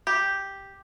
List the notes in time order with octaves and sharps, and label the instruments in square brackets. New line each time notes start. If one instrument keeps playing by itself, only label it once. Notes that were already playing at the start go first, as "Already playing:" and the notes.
[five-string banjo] G4